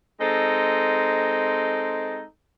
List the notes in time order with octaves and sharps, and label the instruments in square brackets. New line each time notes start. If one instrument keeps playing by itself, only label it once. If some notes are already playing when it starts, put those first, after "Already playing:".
[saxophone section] G#3 C4 D#4 A4